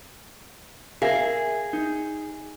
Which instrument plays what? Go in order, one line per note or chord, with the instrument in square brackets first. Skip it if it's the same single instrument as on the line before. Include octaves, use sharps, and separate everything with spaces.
[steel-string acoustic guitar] G#4 [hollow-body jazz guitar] A#4 E5 F5
[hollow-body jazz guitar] D#4